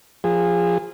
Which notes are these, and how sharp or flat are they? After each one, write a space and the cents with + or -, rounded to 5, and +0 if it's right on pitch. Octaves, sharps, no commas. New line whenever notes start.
F3 +0 G#4 -25